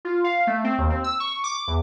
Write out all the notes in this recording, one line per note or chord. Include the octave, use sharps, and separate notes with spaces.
F4
F5
A3
C4
D#2
C4
E6
C#6
D6
E2